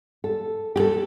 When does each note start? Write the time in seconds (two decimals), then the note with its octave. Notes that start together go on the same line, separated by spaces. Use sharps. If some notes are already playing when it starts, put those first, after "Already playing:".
0.24 A4
0.76 G4
0.80 A4